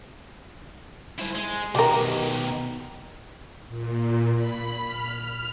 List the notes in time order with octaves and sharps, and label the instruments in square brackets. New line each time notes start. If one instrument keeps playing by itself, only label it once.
[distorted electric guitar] E4 C5
G#3
[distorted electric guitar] B2 D#3 [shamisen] G4 A#4
[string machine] A#2
B5
F6